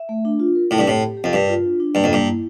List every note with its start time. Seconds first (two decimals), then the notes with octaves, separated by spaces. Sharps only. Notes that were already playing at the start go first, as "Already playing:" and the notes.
Already playing: E5
0.09 A3
0.25 D4
0.40 F4
0.55 A#4
0.71 A2 C4
0.78 G2
0.87 A2 G4
1.02 G4
1.17 G4
1.24 F2
1.33 G2 A#4
1.49 F4
1.64 D4
1.80 D4
1.95 G2 A#3
2.04 F2
2.10 G2 A#3
2.27 E4